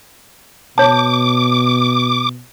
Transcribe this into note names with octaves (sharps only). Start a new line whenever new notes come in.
B2 C#5 A5 D6